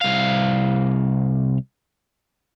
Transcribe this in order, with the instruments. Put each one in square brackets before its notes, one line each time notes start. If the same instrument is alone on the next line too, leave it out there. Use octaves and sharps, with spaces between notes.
[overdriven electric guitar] C2 F5